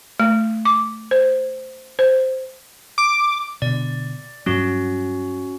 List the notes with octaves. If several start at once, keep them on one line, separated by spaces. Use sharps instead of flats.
A3
D6
C5
C5
D6
B2 D3 D5
G2 F#3 C#4 F#4